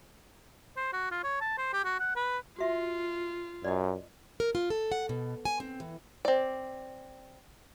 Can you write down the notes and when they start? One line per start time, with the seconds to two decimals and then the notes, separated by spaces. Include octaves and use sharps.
0.77 C5
0.93 F#4
1.11 F4
1.24 C#5
1.41 A5
1.58 C5
1.73 G4
1.84 F#4
2.00 F#5
2.15 B4
2.59 F4 F#4 E5
3.64 F#2 D5 D#5
4.40 A#4
4.55 F4
4.70 A4
4.92 F#5
5.09 B2
5.45 G#5
5.60 C4
5.80 E3
6.25 C4 D5